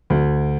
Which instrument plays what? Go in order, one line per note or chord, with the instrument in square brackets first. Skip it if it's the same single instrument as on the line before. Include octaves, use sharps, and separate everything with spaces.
[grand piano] D2